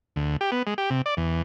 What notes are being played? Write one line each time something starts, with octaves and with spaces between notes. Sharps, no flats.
D2
G4
B3
G#3
G4
C3
D5
E2